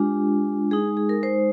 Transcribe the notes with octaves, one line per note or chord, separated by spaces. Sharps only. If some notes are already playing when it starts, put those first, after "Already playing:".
Already playing: G#3 D4 F4 G4
G#3 D#4 G#4
G#4
A#4
C5